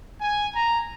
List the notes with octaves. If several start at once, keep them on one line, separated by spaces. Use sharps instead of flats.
G#5
A#5